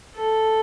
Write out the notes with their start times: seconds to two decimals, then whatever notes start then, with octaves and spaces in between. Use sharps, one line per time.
0.16 A4